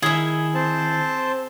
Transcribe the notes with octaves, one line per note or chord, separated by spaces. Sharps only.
D#3 E4 G#4 E5
C4 C5 A5